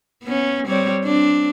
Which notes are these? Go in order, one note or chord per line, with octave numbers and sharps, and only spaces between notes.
B3 C#4
G3 C4 C#5
C4 D4